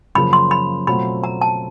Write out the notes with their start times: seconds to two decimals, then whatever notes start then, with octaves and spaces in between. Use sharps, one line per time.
0.15 F#2 C#3 F3 A#3 B5
0.33 C6
0.51 B5
0.87 B2 F#3 A3 C4 F4 B5
1.24 A#5
1.41 A5